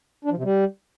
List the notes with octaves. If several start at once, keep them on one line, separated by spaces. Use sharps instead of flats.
D4
F3
C3
G3